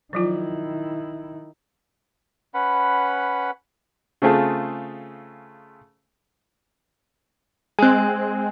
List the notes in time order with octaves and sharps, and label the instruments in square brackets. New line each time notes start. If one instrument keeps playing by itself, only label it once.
[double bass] D#3 E4 [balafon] F3 F#3 F4
[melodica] C#4 B4 F#5 B5
[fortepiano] C#3 A3 C4 F4 G#4 A4
[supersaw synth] G#3 C4 [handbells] G#5 F#6